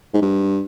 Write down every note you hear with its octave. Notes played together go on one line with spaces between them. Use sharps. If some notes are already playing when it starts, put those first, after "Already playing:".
G#2
G2